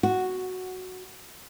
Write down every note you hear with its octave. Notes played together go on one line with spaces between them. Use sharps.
F#4